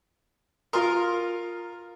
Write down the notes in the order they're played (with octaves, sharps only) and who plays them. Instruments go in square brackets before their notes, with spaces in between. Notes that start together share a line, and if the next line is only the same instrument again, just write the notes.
[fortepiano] F4 C6 D#6 [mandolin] A#4